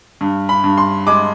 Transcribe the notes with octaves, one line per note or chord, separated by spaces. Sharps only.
G2
B5
G2
C6
G#3 D6